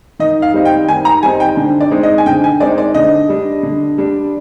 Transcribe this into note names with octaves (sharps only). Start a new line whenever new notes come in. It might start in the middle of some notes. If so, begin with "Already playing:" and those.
D#3 D#5
F5
G3 C4 D#4
G5
D#3 G#5
A#5
G3 C4 D#4 G#5
G5
D3
D5
G#3 C4 D#4
D#5
G#5
D3 G5
G#5
G#3 C4 D#4 D5
D5
D3 D#5
G3 D4
D3
G3 D4